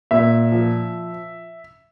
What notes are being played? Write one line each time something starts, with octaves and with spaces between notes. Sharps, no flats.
A#2 E5
F3